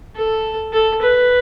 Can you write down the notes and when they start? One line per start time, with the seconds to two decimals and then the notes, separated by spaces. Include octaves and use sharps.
0.16 A4
0.73 A4
1.02 B4